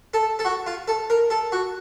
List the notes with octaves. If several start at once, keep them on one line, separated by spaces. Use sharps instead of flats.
A4
A4
F#4
F4
A4
A#4
A4
F#4